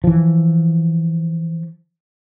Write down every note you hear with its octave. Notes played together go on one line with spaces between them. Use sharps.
E3 F3